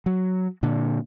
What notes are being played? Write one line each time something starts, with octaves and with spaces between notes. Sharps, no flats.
F#3
A#2 D3